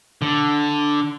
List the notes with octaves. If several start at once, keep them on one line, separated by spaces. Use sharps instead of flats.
D3